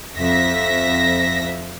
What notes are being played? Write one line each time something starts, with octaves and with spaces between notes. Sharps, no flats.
F2 E5 A#6 B6